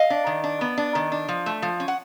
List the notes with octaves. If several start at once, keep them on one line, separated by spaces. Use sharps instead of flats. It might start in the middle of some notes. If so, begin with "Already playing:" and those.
Already playing: D#5 F5
D4
D#3
D4
B3
D4
D#3
D4
F3
A3
F3
C#4
F#5